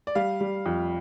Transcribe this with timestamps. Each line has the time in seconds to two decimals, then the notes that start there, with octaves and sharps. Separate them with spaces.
0.07 D5
0.15 G3 F5
0.41 G3
0.66 F2